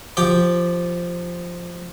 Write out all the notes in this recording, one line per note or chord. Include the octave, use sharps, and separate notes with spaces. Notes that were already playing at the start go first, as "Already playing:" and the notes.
F3 G4 G5